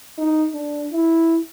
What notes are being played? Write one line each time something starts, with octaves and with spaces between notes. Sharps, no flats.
D#4
D4
E4